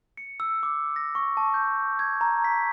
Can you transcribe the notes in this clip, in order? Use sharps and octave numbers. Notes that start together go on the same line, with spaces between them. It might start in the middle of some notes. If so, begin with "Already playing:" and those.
C#7
E6
D6
A#6
C#6
A5
G6
G#6
A#5
B6